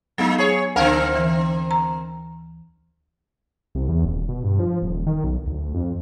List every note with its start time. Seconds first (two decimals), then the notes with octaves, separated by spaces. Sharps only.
0.18 F#3 G#3 B3 D#4
0.38 G#4 C#5
0.76 D2 D3 C4 A#4 F5 A5
1.16 E3
1.71 A#5
3.75 C2
3.88 E2
4.05 D#1
4.29 B2
4.44 G2
4.59 F3
4.82 D#1
5.07 D#3
5.24 B1
5.46 D2
5.74 F2